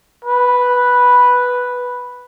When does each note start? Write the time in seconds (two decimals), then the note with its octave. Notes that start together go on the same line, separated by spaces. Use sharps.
0.25 B4